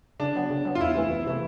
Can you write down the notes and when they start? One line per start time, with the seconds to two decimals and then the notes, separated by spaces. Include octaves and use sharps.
0.20 C#3 D4
0.35 F#3 B3
0.50 C#3
0.65 F#3 B3
0.75 F4
0.81 E2 E4
0.95 C3 E3 A3
1.11 E2
1.26 C3 E3 A3